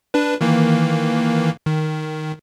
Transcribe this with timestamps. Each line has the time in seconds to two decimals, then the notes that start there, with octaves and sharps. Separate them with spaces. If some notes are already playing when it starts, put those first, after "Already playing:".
0.14 D4 B4
0.41 D#3 E3 A#3
1.66 D#3